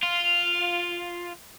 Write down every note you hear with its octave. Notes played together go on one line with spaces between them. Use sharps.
F4